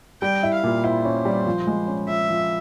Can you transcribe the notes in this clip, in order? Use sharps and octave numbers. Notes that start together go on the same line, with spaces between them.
G3 G5
E4
F5
A#2
E4 C5
C#4
G3
F3
G#3
C#4
F3 E5
F3